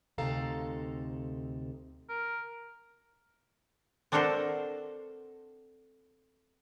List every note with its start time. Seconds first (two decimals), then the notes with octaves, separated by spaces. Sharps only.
0.18 D2 C3 D#4 A4 F5 A#5
2.09 A#4
4.12 C4 D4 F#4 A4 A#4 C5